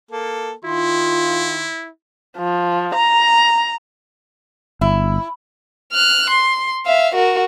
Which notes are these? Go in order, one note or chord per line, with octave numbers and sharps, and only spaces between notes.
A#3 A4
D#3 E4 F4 C6
F3
A#5
G1 E4
F6 F#6
C6
E5 F5
F#4 A#4